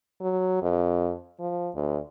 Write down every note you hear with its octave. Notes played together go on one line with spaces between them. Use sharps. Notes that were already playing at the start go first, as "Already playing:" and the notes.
F#3
F2
F3
D2